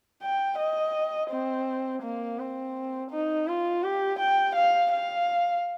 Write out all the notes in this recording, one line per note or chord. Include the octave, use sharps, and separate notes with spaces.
G5
D#5
C4
A#3
C4
D#4
F4
G4
G5
F5
F5